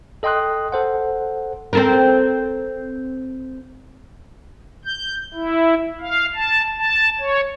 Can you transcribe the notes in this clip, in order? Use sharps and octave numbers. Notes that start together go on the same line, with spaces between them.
A4 D#5 G5 C6 D#6 F#6
A4 C5 F#5
C4 A4 A#4
G6
E4
F5
A5
A5
C#5